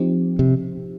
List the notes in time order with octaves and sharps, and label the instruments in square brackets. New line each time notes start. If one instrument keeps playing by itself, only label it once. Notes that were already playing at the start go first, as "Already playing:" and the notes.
Already playing: [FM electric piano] F3 C4 D#4 G4
[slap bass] C3